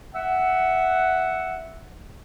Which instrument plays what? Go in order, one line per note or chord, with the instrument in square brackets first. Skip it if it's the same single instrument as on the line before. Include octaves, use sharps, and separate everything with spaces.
[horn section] E5 F#5